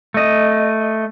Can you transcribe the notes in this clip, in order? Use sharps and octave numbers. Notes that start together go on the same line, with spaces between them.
A3 D#5